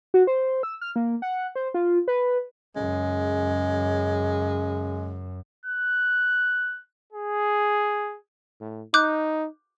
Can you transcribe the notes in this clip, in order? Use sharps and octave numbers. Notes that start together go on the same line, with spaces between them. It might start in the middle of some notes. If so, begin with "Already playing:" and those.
F#4
C5
E6
F6
A#3
F#5
C5
F4
B4
F#2 C#3 G#3
F#6
G#4
A2
D#4 D6 F#6 G6